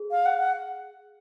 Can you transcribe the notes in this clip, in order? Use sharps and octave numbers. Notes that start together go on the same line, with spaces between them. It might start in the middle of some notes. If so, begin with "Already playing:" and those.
Already playing: G#4
F5
F#5
F#5